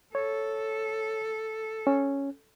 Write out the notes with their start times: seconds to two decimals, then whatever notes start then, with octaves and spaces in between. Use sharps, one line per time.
0.15 A4 C#5
1.87 C#4